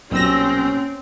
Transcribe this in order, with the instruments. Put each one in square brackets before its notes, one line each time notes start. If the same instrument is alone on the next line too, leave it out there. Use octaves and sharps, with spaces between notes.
[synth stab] B1 E6 A#6 [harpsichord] G2 A#2 [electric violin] C4 [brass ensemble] C#4